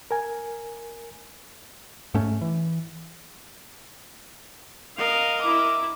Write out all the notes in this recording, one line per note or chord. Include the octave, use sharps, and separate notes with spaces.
A#4 G#5
G#2 A3 C#4
E3
A#4 D#5 F5
E4 D6